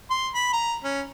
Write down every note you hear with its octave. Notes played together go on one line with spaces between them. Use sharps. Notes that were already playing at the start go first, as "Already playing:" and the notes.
C6
B5
A#5
C#4